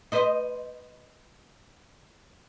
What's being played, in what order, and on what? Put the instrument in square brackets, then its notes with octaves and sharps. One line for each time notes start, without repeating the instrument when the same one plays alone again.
[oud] B4 C5 D#5